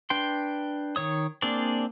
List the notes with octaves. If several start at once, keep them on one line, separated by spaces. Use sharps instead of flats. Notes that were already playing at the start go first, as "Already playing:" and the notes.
D4 B4 G5 C6
D#3 C#5 D#6
A#3 C4 D4 G#4 D5